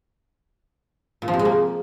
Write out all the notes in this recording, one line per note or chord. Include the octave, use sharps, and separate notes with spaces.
A#2
F3
C3
G#3
A#3